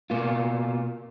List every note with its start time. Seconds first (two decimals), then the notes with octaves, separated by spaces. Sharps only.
0.10 B2 A#3 F4